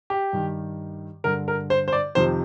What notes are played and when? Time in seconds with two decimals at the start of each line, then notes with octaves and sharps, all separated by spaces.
0.10 G4
0.33 G2 D#3
1.24 G2 D3 A#4
1.48 A#4
1.70 C5
1.88 C5
1.93 D5
2.15 F2 C3 D#3 C5